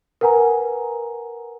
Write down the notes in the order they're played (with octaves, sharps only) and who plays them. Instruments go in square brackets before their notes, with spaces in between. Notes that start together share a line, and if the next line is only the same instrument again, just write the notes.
[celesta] A#4 B4 F#5 G#5 A#5